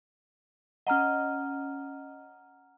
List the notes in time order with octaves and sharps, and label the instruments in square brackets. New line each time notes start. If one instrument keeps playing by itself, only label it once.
[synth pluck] C#4 D#5 [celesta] F#5 A#5 F6